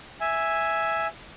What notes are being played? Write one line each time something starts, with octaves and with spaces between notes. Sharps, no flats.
E5 G#5